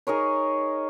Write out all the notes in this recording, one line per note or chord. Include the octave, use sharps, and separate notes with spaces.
D#4 G#4 A#4 C#5